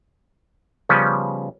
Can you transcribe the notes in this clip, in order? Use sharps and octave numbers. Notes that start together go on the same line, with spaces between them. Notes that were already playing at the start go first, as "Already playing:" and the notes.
C#3 F3 G3 B3 C#4